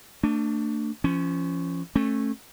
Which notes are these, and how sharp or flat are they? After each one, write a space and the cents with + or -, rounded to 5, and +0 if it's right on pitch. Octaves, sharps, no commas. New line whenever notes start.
A3 +35 D4 +10
F3 -30 C#4 +0
A3 +0 C#4 -25